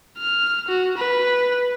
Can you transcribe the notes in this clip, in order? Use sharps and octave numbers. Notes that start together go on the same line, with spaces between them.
F6
F#4
B4